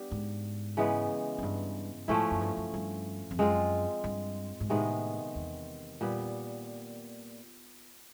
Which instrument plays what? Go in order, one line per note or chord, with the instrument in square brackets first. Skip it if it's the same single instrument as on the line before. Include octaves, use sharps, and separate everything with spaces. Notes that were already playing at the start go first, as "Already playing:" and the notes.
Already playing: [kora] G3 B3 D4 G4
[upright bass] G#2
[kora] C#3 E3 G#3 B3
[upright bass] F#2
G2
[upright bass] G#2 [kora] F3 A3 C#4 E4
[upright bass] F#2
G2
F#2
G2
F2
[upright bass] F#2 [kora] G#3 C4 F4
[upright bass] G2
G#2
[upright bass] A2 [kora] C3 D#3 G#3 B3
[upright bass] E2
[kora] A#2 G3 B3